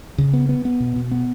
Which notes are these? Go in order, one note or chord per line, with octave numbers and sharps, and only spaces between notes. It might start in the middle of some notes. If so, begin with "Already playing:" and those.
C#3
B3
B3
B3
B2
B2
B3